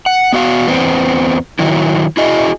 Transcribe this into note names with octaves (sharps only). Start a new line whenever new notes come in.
F#5
B3 F#4 F5
E2 B3 C4
D#3 F#3 E4
E4 F#4 G#4 D#5